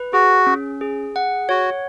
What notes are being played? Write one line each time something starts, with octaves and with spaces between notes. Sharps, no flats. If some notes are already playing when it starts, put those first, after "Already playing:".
Already playing: B4
F#4 G#4
C#4
G#4
F#5
F#4 C#5